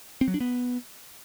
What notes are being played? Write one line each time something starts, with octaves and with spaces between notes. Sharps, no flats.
C4
F#3
D4
B3